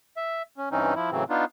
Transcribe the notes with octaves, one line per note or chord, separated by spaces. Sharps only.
E5
C#4
G2 E3 C4 C#4 D#4
F3 E4
A2 C#3 E3 F#3 C4
B3 D4 D#4 F4